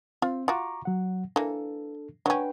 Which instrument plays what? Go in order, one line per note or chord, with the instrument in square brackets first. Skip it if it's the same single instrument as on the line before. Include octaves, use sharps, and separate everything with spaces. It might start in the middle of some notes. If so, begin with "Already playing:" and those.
[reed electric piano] C4 [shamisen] F4
[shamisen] F4 F#4 [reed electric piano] A#5 C#6 D6
[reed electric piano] F#3 F#5
[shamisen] E3 A#3 [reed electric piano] D4 A4
[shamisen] F#3 C#4 [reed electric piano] D4 B4 G5